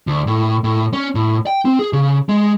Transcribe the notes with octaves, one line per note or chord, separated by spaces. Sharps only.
D2
A2
A2
C#4
A2
G5
C4
G#4
C#3
G#3